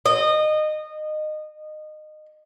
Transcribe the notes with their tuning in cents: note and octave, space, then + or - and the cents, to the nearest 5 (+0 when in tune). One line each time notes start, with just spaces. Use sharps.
D#5 -20